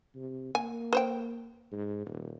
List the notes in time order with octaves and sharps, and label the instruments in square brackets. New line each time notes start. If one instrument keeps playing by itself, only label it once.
[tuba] C3
[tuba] A#3 [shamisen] G#5
[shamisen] B4 C5 G5
[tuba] G#2
D#1